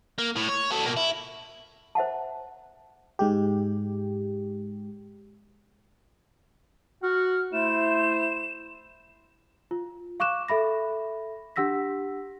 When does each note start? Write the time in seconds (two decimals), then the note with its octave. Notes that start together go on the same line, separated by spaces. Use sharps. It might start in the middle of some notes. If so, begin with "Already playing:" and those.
0.19 A#3
0.37 A2
0.49 C#5
0.71 F#4 A4
0.85 B2 A#3
0.97 E4
1.95 C5 E5 F#5 A5
3.19 G#2 G#3 G4
7.03 F#4 F#5 F6
7.53 A3 E4 C5 E7
9.71 F4
10.20 F5 C#6 D6 F#6 E7
10.48 A4 E5 B5 A#6
11.56 D4 G4 F#5 E6 A#6 B6